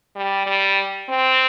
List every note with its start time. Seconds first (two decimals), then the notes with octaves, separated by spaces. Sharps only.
0.15 G3
0.46 G3
1.09 C4